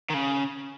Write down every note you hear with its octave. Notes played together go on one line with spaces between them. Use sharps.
D#3
C#3